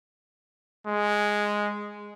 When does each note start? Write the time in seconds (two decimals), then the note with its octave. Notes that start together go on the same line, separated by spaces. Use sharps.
0.87 G#3